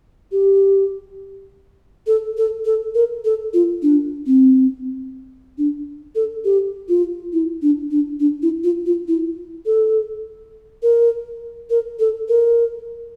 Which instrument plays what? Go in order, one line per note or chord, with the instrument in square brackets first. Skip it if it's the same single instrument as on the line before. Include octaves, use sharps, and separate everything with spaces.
[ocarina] G4
A4
A4
A4
A#4
A4
F4
D4
C4
D4
A4
G4
F4
E4
D4
D4
D4
E4
F4
F4
E4
A4
A#4
A#4
A4
A#4